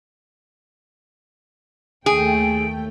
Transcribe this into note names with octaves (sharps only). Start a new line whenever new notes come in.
D#2 A3 G#4 G5 D7